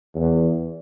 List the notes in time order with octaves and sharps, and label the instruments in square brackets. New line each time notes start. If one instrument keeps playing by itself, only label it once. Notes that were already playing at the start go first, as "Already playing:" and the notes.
[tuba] E2